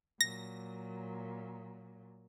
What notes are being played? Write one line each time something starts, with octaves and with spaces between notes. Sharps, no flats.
A#2 F#3 A#6